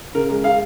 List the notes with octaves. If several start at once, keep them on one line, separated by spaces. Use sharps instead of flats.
C#3 A#4
G#3
G#3 F5